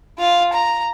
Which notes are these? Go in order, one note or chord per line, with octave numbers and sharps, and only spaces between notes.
F4 F5
A#5